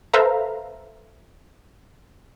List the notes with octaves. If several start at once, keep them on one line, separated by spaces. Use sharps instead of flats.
A4 B4 C5 E5 F5 A#5